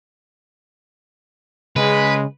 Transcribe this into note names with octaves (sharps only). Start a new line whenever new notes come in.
C#3 G#3 B4